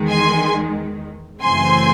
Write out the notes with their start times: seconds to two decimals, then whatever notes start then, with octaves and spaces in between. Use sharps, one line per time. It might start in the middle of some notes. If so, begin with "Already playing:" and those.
Already playing: E2 D#3 G#3
0.10 G#5 C6
1.41 F#2 C#3 E3 A3 C4 G#5 C6